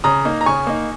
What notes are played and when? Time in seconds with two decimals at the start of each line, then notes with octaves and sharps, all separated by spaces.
0.04 C#3 A#5 D#6
0.25 A#3 D#4
0.41 A#5
0.46 C#3 G#5 C#6
0.67 A#3 D#4